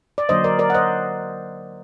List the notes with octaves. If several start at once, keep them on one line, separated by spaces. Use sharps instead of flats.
D5
D3 F#3 A#3 C5 D#5
A#4 D5
A#4 D5
F#5
C5 D#5